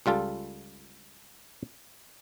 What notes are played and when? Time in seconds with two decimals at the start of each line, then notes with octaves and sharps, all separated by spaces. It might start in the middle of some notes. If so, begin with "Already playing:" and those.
0.06 C#2 G3 F4 A4